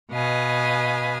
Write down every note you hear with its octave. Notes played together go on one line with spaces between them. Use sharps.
B2 B4 D#5 F5 G#5